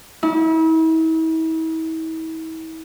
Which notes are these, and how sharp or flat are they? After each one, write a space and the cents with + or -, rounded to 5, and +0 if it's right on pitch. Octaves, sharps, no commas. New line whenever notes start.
E4 -40